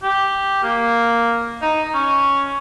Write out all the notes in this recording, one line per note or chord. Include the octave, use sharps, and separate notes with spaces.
G4
A#3
D#4
C#4